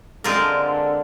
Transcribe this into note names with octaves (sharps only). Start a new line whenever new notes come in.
D3 G#3 C4 F4 A#4